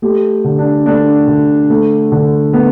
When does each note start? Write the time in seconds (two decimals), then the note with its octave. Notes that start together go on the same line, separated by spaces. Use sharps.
0.02 A3 G4
0.44 D3
0.59 D4
0.86 A3 D4
1.27 D3
1.70 A3
2.12 D3
2.53 A3 B3